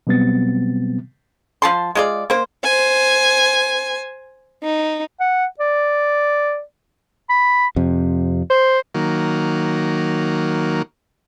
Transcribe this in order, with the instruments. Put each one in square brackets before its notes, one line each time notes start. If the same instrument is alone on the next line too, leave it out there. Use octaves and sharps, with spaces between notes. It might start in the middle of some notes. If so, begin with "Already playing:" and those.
[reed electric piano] B2 F#3 G3 B3 C4 A6
[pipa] F3 A5 C6
G#3 F4 D5
A#3 C5
[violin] C5 G#5
D#4
[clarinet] F#5
D5
B5
[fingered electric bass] F2 C3
[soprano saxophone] C5
[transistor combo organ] D#3 F#3 A#3